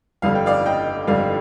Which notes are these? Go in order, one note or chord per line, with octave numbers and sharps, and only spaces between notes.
G1 F2 D3 G3 F5
G5
D5 F5
D#5 G5
G1 F2 D3 G3 D5 F5